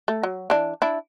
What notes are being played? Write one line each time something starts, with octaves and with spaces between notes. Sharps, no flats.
A3
F#3
E3 D4
D4 E4